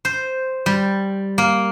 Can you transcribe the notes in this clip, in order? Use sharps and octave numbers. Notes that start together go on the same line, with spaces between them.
C5
G3
A#3